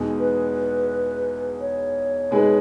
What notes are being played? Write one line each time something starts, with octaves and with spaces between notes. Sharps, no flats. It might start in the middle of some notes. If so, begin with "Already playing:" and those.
Already playing: E2 B2 G#3 D#4
B4
C#5
B2 G#3 D#4 G#4 B4